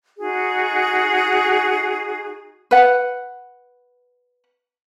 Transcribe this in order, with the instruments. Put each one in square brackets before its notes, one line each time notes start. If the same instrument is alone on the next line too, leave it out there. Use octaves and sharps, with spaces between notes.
[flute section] D#4 F#4 G#4
[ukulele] B4 F#5